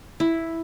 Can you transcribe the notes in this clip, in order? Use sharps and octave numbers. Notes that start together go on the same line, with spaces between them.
E4